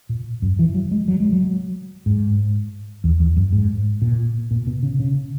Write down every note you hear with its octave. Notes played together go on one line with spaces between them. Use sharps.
A#2
F#2
E3
F#3
G#3
F#3
G#3
F#3
G#2
E2
E2
F#2
G#2
A#2
A#2
B2
C#3
C#3